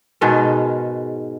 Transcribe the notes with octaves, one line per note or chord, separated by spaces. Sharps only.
G#2 B2 D#3 G#3